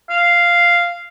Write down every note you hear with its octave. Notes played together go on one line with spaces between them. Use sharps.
F5